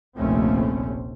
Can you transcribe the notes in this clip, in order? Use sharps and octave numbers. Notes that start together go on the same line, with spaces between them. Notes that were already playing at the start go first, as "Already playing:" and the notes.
F1 A#1 D#2 A3 C4 C#4